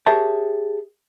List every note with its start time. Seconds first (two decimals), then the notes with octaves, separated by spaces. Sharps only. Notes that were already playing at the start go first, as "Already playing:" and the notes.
0.06 G4 G#4 A#4 C#5 E5 A5